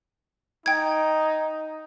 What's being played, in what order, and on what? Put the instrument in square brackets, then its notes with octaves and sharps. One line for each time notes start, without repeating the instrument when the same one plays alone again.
[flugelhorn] D#4 [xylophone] G5 G#6